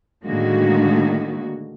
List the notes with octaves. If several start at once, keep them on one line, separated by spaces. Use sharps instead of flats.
A2 D3 D#3 G#3 A#3 F#4